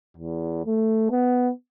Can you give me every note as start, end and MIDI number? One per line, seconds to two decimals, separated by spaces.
0.17 0.65 40
0.66 1.08 57
1.11 1.50 59